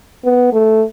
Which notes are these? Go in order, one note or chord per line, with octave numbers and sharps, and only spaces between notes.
B3
A3